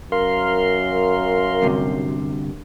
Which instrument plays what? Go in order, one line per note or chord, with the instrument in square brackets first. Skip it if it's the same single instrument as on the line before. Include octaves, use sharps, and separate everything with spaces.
[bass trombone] F#2 [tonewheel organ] A#4 F5 C6
[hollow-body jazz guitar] D2 G2 C3